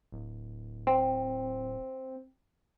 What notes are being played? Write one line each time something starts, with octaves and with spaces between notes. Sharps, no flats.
D1
C4